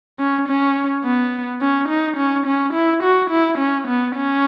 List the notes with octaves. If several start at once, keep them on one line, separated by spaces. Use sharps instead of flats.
C#4
C#4
B3
C#4
D#4
C#4
C#4
E4
F#4
E4
C#4
B3
C#4